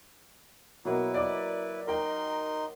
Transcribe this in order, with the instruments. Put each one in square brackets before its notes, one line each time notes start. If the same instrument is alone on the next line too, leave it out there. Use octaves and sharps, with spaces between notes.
[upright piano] B2 [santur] F#3 A#3 D#5 [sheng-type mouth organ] E4 B4
[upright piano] D5 D6
[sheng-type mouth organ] D#4 C6 [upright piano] A#4 G5